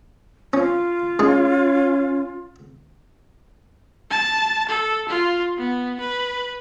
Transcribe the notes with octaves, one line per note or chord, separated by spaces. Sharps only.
C#4 F4
G#3 C#4 D#4
A5
A4
F4
B3
B4